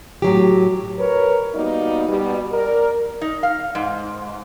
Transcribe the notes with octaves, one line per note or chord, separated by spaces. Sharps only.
A2 F#3 G4
A#4 B4 C#5
G3 A#3 B3 D#4 F#4 D5
B2 G3
A#4 D5
D#4
F5
G#2